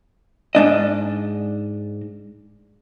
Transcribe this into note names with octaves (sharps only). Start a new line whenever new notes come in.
G#2 D4 D#5